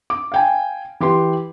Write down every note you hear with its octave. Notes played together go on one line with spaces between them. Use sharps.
D6
F5 G5 G#5
E3 G4 B4 C6